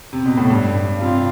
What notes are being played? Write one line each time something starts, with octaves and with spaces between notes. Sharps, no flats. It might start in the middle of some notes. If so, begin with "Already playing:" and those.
C3
B2
A2
G2
C3 F4